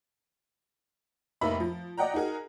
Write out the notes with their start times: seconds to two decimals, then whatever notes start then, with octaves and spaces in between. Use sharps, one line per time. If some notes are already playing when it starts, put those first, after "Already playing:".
1.41 F1 A2 A#3 D#4 E5 B5
1.60 F3
1.98 D5 D#5 F#5 G5 A#5
2.14 D#4 F#4 G#4 A#4